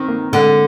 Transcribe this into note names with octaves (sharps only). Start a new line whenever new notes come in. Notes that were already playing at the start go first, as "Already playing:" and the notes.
Already playing: D#3 C4
A#3
D3 G#3